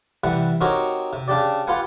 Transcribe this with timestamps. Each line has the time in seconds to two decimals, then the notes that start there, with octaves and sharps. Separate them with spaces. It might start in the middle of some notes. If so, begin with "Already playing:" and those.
0.24 C3 E3 G3 F#5
0.61 C4 D#4 F#4 G4 A#4 C#5
1.13 C3
1.28 C#3 D4 G4 D5
1.67 F4 G4 B4 F5 F#5 G#5